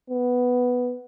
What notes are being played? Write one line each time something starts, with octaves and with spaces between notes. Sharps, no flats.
B3